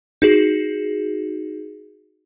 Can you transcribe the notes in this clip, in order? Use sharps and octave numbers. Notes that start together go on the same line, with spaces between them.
D#4 F#4 G#4